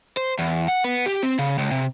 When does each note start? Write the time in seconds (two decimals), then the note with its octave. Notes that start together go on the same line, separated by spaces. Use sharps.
0.17 C5
0.39 E2
0.68 F#5
0.84 B3
1.06 G4
1.23 C4
1.39 C#3
1.58 C#2
1.71 C3